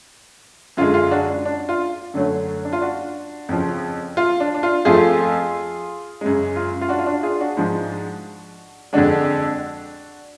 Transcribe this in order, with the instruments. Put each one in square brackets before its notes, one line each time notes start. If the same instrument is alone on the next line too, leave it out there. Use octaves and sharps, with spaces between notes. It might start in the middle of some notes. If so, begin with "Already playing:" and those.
[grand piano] F#2 D3 G#3 F4
F4
D4 F#4
D4
F4
F#2 D3 F#3 A3
D4
F4
D4 F#4
F2 C#3 F3
F4
D4
D4
F4
F2 F3 A3 F4 G#4
F#2 C#3 G#3
F4
F4
D4 F#4
F4
D4 F#4
F4 G#4
D4 F#4
G#2 F3 G#3
F2 D3 G#3 D4 F#4